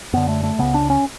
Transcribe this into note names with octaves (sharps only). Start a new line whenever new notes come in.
F#2 D3 B3
A3
A3
C#2 C#3 B3
D4
C#4